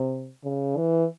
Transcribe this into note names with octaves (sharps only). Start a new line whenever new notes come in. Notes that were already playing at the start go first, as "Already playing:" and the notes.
Already playing: C3
C#3
E3